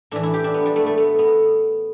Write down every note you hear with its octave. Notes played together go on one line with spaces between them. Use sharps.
A2 E3 D4
E4
G4
D4
B3
G3
A3
A3
B3
B3